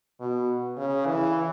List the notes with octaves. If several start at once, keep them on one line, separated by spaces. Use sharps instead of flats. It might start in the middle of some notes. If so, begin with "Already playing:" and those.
B2
C#3
E3